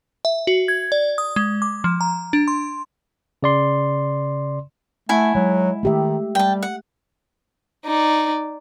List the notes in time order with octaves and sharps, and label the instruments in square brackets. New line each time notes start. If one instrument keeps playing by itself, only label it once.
[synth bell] E5
F#4
G#6
D5
D#6
G#3
D6
F3
A#5
D4
C6
[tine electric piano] C#3 D5 C6
[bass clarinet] A3 [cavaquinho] E4 F#5 G#5
[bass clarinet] F#3 [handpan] G#3
[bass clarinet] D#3 [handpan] A3 G4 E5
[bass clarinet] G3 [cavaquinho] G5 A5
[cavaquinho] F#5
[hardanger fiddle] D#4 D5